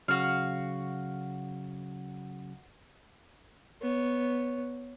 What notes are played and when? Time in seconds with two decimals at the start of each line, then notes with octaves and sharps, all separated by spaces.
0.08 C#3 F#3 F#4 F5
3.81 B3 C#5